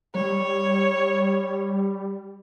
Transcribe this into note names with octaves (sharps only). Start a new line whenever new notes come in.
G3 C#5